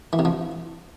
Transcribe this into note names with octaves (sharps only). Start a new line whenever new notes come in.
E3
C3
F3